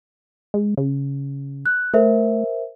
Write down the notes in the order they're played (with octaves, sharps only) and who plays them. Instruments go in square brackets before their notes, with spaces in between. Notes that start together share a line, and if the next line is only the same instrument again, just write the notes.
[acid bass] G#3
C#3
[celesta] F#6
[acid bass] A3 [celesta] A#4 C5 E5